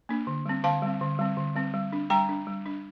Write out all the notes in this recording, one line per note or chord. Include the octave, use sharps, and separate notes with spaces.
A#3 D4
D3
G3 C4
D3 F5 A5
G3 C4
D3
G3 C4
D3
G3 C4
G3
D4
G3 G5 A#5
D4
G3
D4